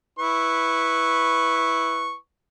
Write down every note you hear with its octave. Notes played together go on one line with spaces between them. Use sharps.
E4 B4 C#6